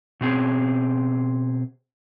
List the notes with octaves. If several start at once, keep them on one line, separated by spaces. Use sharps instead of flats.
B2 C4 G#4